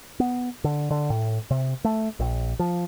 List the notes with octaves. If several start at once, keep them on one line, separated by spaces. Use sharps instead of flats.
B3
D3
D3
A2
C3
A3
A#1
F3